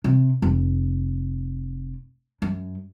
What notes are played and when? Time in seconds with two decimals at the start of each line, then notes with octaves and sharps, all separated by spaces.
0.04 C3
0.42 F1
2.42 F#2